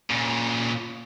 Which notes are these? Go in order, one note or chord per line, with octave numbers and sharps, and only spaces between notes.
A#2 C#3